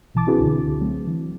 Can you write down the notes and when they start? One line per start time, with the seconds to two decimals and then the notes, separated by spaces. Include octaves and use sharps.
0.14 A#1 B2 E3 A5 D6 A6
0.27 C4 D4 E4 F#4 G#4 B4
0.40 C#2 D3
0.80 F#3 A3 C4
1.07 E3